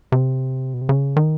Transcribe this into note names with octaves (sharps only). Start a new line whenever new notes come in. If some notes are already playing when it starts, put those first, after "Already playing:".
C3
B2
C3
C#3
D#3